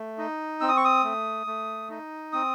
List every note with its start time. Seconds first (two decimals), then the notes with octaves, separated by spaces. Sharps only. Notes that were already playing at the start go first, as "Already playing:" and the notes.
Already playing: A3
0.18 D#4
0.61 C4 E6
0.69 D#6
0.77 C#6
0.85 D#6
1.04 A3
1.47 A3
1.90 D#4
2.33 C4 D#6